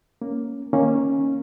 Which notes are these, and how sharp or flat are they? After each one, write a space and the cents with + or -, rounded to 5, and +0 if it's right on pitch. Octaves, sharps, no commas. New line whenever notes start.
A#3 +0 C#4 +5
D#3 +0 A#3 +0 C#4 -10